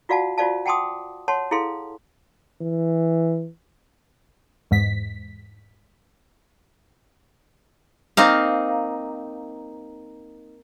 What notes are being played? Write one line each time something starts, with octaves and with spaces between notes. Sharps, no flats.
F4 F#4 D5 F5 F#5 A5
F4 F#4 C5 D5 F5 A5
F#5 G5 A5 C6 D6 D#6
C#5 F#5 A5 C6
E4 G#4 A4 F5 C6
E3
E2 G#2 B6
A#3 C4 D#4 F5